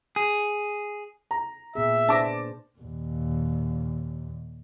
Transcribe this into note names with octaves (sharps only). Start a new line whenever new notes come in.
G#4
A#5
A#2 B3 G#4 E5
D4 B4 C5 A5 D6 A#6
D#2 A#2